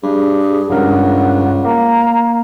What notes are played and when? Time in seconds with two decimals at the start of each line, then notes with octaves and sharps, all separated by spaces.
0.03 G2 G#4
0.70 C#2 G2 A#4 F#5
1.65 A#3 A#5